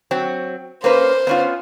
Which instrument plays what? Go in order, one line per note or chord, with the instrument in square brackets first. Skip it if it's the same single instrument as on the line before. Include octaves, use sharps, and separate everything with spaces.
[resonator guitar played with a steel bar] F#3 C4
[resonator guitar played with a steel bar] A#3 C#4 B4 [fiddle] C5
[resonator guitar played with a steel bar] B3 C#4 F4